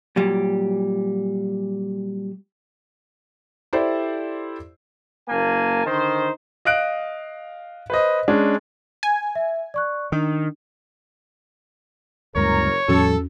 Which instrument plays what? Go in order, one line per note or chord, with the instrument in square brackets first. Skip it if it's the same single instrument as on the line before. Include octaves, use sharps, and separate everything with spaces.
[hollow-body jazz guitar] A#2 F#3 G3
[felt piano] E4 G4 A4 C5 D5
[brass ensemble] F#1 A#3 A#4 G#5 A5
D3 D#3 D#4 C5
[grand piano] D#5 F5 F#6 D7
B4 C5 D#5
G#3 C#4 D4
[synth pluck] G#5
[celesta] E5
D5 C#6 F#6
[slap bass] D#3 [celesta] D4
[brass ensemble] F#1 A#4 A#5 [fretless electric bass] D2 G2 G#3 [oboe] C#5
[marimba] E2 C#4 F#4 [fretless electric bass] A2 F3 G3 [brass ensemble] A4